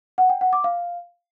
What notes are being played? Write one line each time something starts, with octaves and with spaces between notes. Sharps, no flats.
F#5
G5
F#5
D6
F5